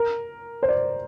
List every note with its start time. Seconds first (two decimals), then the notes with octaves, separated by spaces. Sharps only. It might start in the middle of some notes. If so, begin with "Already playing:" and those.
Already playing: A#4
0.63 C5
0.69 D5